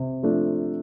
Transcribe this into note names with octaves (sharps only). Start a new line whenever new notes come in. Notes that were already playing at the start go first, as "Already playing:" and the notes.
Already playing: C3
F3 A3 D4